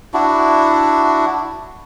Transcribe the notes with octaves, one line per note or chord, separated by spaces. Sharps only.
D4 E4 F#4